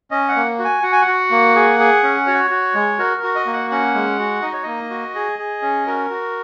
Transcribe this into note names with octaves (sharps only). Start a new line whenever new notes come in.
C#4 D#5
F#5
A#3
F#4
G#5
F#4 F#5
G#5
F#5
F#4
A#3
G#4
G#4
C#4
F#4 C#5
F#4
G#3
F#4 A#4
A#4
F#4
D#5
A#3
F#5
C#4 F#5
G#3
F#4
D#4 D#5
C#5
A#3 D#5
F#4
G#4
G#4
C#4
F#4 A#4
F#4